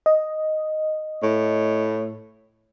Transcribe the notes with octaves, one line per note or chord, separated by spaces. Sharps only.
D#5
A2